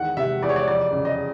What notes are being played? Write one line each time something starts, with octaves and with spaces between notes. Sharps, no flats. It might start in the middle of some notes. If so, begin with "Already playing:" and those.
Already playing: E2 D#3 F#5
C3 E5
E2 D5
C#5
D5
F2 D5
C#3
D#5